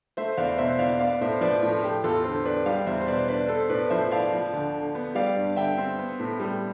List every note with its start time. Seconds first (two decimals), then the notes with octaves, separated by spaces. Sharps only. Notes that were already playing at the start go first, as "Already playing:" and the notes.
0.17 A3 C5 E5
0.38 E2 D5 F5
0.58 B2 C5 E5
0.79 E2 D5 F5
0.99 B3 D5 F5
1.21 A2 C5 E5
1.41 F3 B4 D5
1.62 A2 F4
1.83 A3 G4
2.04 E2 F4 A4
2.24 D3 A4 C5
2.45 D4 B4 D5
2.66 G3 D5 F5
2.86 E2 C5 E5
3.02 C5
3.07 B2 B4 D5
3.28 D4 B4 D5
3.49 B3 A4 C5
3.69 A2 B4 D5
3.90 F3 C5 E5
4.12 E4 D5 F5
4.33 F3
4.53 D2
4.73 D3
4.95 B3
5.15 G3 D5 F5
5.37 G2
5.56 D3 E5 G5
5.78 C4
5.99 B3
6.20 A2
6.40 G3